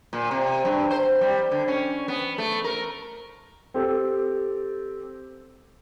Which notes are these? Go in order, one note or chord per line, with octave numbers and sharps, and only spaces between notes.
A#2
C3
G2
C5
G3
D3
C#4
B3
A3
A#4
C4 G4 A4